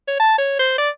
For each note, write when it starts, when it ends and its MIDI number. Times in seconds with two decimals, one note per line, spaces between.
0.08 0.18 73
0.20 0.38 81
0.38 0.55 73
0.59 0.76 72
0.78 0.90 74